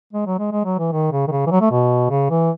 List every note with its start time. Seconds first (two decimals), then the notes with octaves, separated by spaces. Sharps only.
0.13 G#3
0.26 F#3
0.39 G#3
0.52 G#3
0.65 F#3
0.79 E3
0.92 D#3
1.12 C#3
1.28 D#3
1.32 C#3
1.47 E3
1.51 F#3
1.61 A3
1.71 B2
2.10 C#3
2.30 E3